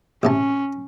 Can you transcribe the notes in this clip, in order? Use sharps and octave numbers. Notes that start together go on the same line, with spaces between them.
A1 C3 C#4 A5